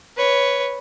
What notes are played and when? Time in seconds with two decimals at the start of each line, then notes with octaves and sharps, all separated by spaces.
0.17 B4 C#5